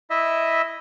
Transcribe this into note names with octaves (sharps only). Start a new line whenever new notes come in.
E4 D#5 E5